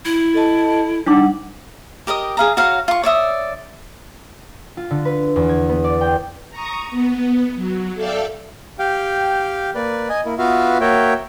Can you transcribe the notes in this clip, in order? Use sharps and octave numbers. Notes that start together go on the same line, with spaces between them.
E4
A4 D#5 A5
G3 D4 D#4 F#5 D6
G4 A#4 D#5 D#6
G#4 F5 A#5
F#4 C#5 F5 A#5
F4 C#6
C#5 D5 E5 D#6
F4
D3
B4
E2
G#6
B3
D5
G5
A#5 C#6 D#6
B3
F#3
A4 D5 E5 F5 G5 F6
G4 F5 G5
A#3 B4 D5
D#5 G#5
A#3 E4
B3 F4 F#4 B4 E5 F5
A#3 F#4 C#5 E5 G5